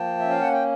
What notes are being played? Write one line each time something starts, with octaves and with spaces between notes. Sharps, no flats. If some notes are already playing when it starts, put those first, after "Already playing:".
Already playing: F3 A#3 G5 A5
C#4 E5
F5
F#5
G5